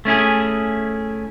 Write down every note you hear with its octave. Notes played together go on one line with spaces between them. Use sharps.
A3 C#4 E4 G#4